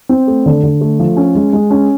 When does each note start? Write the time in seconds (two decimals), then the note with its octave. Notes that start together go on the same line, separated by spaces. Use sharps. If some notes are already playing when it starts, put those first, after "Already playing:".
0.09 C4
0.28 A3
0.46 D3
0.63 D3
0.81 A3
0.99 F3
1.17 C#4
1.35 G#3
1.53 G#3
1.71 C#4